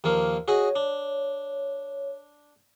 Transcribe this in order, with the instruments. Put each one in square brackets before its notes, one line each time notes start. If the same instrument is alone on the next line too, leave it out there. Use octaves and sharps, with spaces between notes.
[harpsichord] D#2 F3 A#3
[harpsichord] F#4 G#4 D#5 [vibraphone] C#5
[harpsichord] D4